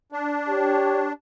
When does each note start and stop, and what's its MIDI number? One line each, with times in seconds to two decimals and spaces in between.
0.12 1.13 62
0.49 1.09 67
0.49 1.09 73